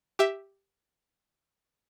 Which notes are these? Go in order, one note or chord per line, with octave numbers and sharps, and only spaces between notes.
G4 E5